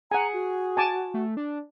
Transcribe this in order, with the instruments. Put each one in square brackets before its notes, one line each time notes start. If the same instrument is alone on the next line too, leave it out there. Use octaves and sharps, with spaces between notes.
[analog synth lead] G#4 [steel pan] F#5 G#5 [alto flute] A#5
[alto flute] F#4
[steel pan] G#5 A5 D6
[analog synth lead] A3
D4